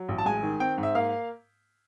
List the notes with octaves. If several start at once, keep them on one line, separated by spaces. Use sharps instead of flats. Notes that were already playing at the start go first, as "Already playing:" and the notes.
Already playing: F#3
A1
A5
G#3 G#5
D#3
C4 G5
G#2
E5
A#3 F5